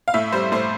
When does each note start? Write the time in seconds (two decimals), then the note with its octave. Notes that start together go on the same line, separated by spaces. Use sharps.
0.08 F5
0.14 A2 E5
0.32 G3 C5
0.52 A2 C5